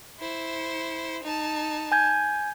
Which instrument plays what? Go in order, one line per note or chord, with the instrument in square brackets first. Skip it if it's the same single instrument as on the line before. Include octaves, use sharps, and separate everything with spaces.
[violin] E4 C5
D#4 A5
[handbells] G#5 G6 G#6